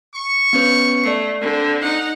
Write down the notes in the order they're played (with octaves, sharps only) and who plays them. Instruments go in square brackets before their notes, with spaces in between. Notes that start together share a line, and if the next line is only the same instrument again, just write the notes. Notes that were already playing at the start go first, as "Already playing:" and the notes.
[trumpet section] C#6
[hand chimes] B3 C#4 B4
[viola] A3 [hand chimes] D5 C7
[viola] D3 [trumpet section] A#3 C4
[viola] D#4 F#5